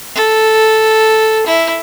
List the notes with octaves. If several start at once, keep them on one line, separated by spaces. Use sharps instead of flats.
A4
E4